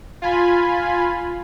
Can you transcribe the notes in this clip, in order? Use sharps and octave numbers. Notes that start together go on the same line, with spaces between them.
F4 G#5 B5